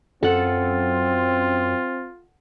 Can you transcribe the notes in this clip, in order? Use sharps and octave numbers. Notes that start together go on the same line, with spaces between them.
F#2 C4 F4 A4 F#5